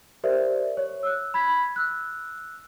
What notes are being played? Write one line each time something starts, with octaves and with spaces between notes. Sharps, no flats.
G4 A#4 C5 D5 E5
C#5
E6 F#6
B5 G#6 B6
E6 F#6